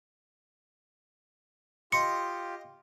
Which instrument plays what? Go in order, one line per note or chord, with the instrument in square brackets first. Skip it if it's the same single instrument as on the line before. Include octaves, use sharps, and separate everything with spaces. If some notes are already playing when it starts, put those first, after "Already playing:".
[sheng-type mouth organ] F4 G4 [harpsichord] D#5 C6 [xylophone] C#7